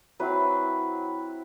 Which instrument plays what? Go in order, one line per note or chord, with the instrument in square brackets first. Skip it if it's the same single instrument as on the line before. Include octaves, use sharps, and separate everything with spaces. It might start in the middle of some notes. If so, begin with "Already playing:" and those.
[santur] F#3 C4 E4 B4